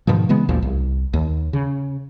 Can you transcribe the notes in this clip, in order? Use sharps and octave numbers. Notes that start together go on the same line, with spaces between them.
G#2 B2 D#3 F3
C#3 E3 G#3 B3
A1 D2 A#2 F3
C2
D#2
C#3